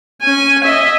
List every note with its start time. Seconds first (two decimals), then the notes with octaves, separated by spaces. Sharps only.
0.21 C#4 G#5
0.64 D#5 E5